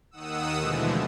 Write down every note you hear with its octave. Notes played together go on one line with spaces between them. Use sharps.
D#2 D#3 F#5 D#6 E6
B2 D3 E3 F3 G#3 A3